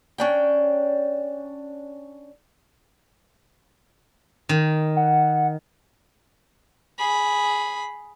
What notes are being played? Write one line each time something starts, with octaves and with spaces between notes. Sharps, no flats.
C#4 D4 G5
D#3
F#5
G#4 B5